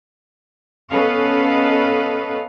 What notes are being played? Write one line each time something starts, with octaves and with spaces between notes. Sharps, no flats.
B3 C#4 A4 B4 D#5 F5